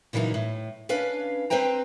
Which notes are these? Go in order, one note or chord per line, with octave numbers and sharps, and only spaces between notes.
A#2 C#3 E3 F#3 D#4
A2
C#4 D4 B4 F5
C4 B4 C5 G5 A#5